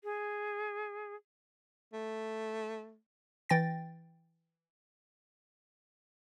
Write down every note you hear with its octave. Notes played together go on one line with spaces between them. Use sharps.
G#4
A3
E3 G5 A6 A#6